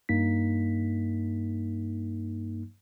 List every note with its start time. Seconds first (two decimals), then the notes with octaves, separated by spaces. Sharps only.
0.09 G2 A#3 D#4 B6